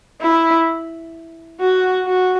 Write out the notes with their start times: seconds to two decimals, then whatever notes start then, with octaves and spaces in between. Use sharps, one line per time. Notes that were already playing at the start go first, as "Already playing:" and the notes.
0.22 E4
1.60 F#4
2.07 F#4